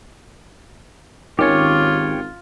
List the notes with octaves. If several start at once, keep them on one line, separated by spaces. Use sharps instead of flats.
G#1 D#3 C#4 F4 G4 C#5